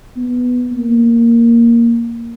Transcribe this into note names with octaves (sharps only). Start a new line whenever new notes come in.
B3
A#3